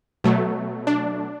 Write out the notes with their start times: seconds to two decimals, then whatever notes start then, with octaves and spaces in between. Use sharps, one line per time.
0.24 B2 F#3 A3
0.87 D4